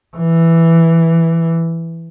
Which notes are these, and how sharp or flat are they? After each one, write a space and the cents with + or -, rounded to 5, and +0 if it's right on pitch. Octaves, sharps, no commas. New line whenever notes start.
E3 +5